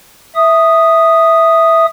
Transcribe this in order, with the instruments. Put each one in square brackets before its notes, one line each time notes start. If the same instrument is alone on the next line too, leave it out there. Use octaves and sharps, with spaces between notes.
[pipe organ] E5 D#6